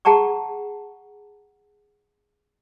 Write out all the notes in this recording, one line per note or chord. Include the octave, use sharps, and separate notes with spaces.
G#4 F#5 A5 A#5 C#6